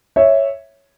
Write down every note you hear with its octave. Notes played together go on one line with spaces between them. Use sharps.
C#5 E5